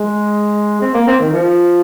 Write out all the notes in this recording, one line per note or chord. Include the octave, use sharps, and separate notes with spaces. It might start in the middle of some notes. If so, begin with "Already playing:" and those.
Already playing: G#3
C4
A#3
C4
D#3
F3